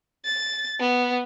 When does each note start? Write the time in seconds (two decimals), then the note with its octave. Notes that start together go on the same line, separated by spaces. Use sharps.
0.25 A6
0.80 B3